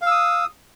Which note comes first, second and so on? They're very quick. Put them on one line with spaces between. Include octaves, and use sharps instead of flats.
F5 E6 D#6